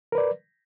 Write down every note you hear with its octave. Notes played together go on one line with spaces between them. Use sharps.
A#4 B4 D5